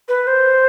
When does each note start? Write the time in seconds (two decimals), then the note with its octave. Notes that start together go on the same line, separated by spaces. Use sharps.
0.08 B4
0.27 C5